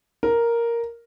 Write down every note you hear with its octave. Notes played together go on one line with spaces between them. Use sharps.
A#4